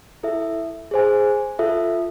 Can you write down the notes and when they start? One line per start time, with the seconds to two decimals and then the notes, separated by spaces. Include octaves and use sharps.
0.23 E4 A4 E5
0.91 G#4 C5 G#5
1.59 F4 A4 E5